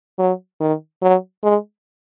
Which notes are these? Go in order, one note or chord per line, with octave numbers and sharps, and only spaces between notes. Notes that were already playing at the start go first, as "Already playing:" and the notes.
F#3
D#3
F#3
G#3